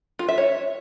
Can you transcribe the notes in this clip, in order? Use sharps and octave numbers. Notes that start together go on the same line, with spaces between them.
F4
E5
C#5